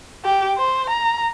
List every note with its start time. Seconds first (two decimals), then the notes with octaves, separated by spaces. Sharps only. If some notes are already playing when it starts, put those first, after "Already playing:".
0.25 G4
0.58 C5
0.90 A#5